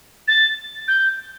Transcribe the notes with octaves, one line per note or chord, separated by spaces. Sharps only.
A6
G6